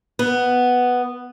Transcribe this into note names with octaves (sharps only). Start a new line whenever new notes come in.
B3